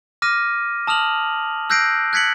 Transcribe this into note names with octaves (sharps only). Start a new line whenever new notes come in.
D6 F6 A#6 D#7
A5 D#6 F6 F7 F#7
E6 F#6 G6 A#6 C7 D7
F#6 G#6 B6 C#7 F#7